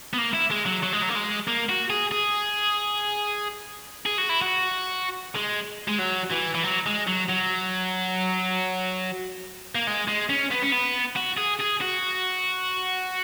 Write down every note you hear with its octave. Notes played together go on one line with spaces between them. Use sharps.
B3
A#3
E4
G#3
F#3
F#3
G#3
F#3
A#3
G#3
A#3
F#4
G#4
G#4
G#4
F#4
E4
F#4
G#3
G#3
F#3
E3
E3
F#3
G#3
F#3
F#3
A#3
G#3
G#3
C#4
B3
C#4
B3
F#4
G#4
G#4
F#4